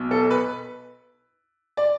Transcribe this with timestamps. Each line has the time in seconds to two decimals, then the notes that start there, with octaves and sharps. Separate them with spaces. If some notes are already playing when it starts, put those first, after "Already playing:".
Already playing: B1 B2
0.11 A4
0.30 B4
1.77 D5